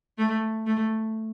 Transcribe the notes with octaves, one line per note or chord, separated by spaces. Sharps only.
A3
A3